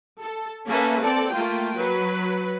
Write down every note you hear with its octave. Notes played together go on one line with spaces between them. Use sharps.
A4
A#3 C#4 A4 B4 E5
C4 A4 D5
A3 A#3 F4 G5
F#3 B4